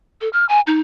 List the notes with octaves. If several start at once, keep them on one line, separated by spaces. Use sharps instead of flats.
A4
F6
G#5
D#4